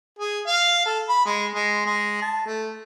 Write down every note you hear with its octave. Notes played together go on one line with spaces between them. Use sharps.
G#4
F5
A4
B5
G#3
G#3
G#3
A5
A3